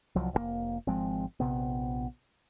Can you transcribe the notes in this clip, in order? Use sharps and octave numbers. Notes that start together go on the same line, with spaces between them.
C2 F3 F#3
F1 A2 A#3
G#1 F3 G#3 C4
A#1 C3 B3